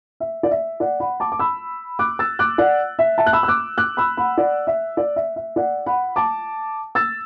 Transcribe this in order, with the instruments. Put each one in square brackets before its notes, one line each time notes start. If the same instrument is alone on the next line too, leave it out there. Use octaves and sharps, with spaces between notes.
[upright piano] E5
D5
E5
D5 F#5
F#5 B5
A5 D6
D6
B5 E6
D6 F#6
E6 A6
D6 F#6
D5 F#5
E5
E5 A5
F#6
B5 E6
E6
D6 F#6
D6 F#6
B5 E6
F#5 B5
D5 F#5
E5
D5
E5
E5
D5 F#5
F#5 B5
A5 D6
E6 A6